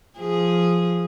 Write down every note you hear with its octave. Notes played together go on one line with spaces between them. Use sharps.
F3 G#4